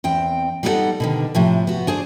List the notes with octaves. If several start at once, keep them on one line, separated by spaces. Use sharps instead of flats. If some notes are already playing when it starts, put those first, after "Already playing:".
E2 C4 G5
G3 B3 D#4 E4 A4 F#5
B2 D3 D#3
A2 C3 F3
B3 F#4
D4 G#4 C5 D5